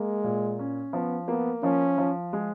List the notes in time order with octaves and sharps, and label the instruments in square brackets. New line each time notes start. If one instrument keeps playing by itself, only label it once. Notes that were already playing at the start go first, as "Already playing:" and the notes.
Already playing: [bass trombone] G#3 [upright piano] A#3
[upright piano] A#2
C#4
[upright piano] F3 [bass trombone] B3
[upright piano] A#3 [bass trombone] B3
[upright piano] F3 [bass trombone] C#4
[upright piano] F3
G#3